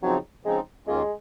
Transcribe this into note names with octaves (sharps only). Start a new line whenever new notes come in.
C#3 F3 F#3 C4 D#4
C#3 F3 G#3 C4 D#4
D#2 D#3 G#3 A#3 C#4 F4